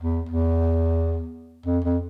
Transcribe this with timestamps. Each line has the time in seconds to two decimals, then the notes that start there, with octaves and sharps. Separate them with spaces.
0.01 E2
0.29 E2
1.66 F2
1.84 F2